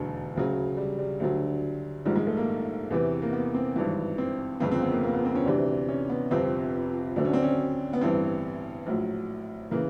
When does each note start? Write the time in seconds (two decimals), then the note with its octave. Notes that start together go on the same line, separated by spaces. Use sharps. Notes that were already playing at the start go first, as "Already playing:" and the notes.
Already playing: E1 D#2 D3 F#3
0.35 D2 C#3 F#3
0.77 G3
0.98 G3
1.20 D2 D3 F#3
2.05 A#1 G#2 D#3 G3
2.16 G#3
2.27 A3
2.37 A#3
2.90 E2 C3 E3
3.22 A#3
3.33 B3
3.54 C4
3.76 G#1 G2 E3
4.18 C4
4.60 G1 F2 C#3 C4
4.71 C4
4.82 B3
4.92 A#3
5.03 A#3
5.14 B3
5.25 C4
5.35 C#4
5.46 D2 C3 E3 D4
5.88 C#4
6.09 B3
6.31 G1 F2 C3 C4
7.16 D2 D3 F#3 D4
7.25 C#4
7.34 C4
7.43 C#4
7.93 B3
8.01 A1 G2 E3 C4
8.86 A#1 A2 F#3
9.71 C#3 E3 A#3